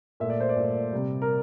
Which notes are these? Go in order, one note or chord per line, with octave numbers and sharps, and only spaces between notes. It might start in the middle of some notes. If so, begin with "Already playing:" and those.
A#2 A3 E5
D5
C5
D5
A#2 A3
C3 G3
A#4